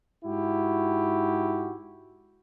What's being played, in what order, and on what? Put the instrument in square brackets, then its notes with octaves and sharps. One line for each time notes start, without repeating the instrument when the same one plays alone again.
[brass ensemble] G#2 E4 F#4 G4